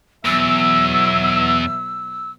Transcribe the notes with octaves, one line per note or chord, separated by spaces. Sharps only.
E2 B2 F#3 E5 E6